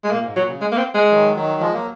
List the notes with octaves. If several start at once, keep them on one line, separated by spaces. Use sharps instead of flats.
G#3
A#2 A#3
G#2
A#2 F#3
C#3
G#3
A#3
C4
G#3
D#3 F#3
D#3 F#3
F3 G#3
F#3 A#3